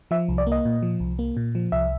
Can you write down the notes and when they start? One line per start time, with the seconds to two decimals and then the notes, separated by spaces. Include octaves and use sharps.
0.11 F3 E5
0.28 C2
0.38 D5
0.47 A#3
0.52 D#5
0.65 A#2
0.82 F3
1.00 C2
1.19 A#3
1.37 A#2
1.55 F3
1.72 C2 E5